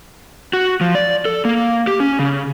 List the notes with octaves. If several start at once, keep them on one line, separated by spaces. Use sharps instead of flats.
F#4
F3
D5
A4
A#3
G4
C#4
C#3